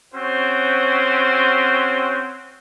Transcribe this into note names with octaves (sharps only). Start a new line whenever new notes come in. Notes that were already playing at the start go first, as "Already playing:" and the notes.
C4 C#4 F#4 C5